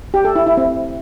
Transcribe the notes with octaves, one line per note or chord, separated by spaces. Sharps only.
G4
A4
E4
E4
C4